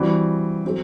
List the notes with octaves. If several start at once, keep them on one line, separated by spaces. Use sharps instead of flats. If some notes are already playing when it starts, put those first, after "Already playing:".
Already playing: E3 G3 C4 F#4
F#3 C4 F#4 A4